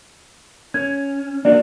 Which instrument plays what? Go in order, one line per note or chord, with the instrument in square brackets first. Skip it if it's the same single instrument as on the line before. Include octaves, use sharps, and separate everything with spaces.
[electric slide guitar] C#4 [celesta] G#6
[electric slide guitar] A#3 D4 F#4 [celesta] D5